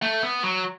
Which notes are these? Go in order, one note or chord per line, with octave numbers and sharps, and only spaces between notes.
A3
B3
F#3